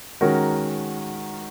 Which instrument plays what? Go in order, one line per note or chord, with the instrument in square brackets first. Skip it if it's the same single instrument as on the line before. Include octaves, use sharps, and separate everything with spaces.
[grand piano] D#3 G#3 C#4 F#4 A#4